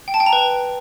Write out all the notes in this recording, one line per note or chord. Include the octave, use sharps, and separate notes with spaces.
G5
A5
G5
A#5
B4